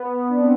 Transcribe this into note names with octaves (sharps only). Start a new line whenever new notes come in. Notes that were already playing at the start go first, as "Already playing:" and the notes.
Already playing: B3
D4
C4